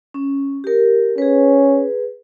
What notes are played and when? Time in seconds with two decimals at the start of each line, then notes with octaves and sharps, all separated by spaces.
0.14 C#4
0.64 G4 A#4
1.18 C#4 G#4 B4